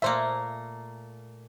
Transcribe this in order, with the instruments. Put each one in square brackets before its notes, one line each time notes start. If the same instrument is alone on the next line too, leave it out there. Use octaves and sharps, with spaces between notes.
[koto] A#2 A3 A#3 [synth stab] C5 E5